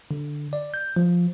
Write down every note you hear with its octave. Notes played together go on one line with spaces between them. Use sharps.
D3
D5
G6
F3